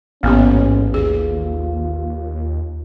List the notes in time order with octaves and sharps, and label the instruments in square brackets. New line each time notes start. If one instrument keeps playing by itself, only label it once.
[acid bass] A1 [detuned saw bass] G#2 [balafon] A#3 B3 G4 [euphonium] C#4
[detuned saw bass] D#2 [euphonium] F4 [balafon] G#4